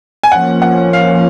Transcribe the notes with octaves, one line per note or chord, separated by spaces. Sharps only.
G#5
F3 A#3 C#4 F#5
F#5
F5